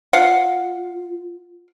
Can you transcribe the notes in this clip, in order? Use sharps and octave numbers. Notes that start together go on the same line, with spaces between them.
F4 F5 F#5